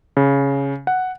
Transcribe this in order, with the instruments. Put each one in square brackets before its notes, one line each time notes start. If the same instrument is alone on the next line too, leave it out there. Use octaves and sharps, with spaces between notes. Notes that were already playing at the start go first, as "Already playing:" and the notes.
[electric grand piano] C#3
F#5